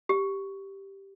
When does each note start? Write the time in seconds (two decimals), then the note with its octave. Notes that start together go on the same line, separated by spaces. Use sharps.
0.09 G4